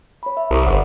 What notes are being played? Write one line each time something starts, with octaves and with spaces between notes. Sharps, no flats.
C#5 B5
E5
C2 A#5 D#6
G1 D5 F#5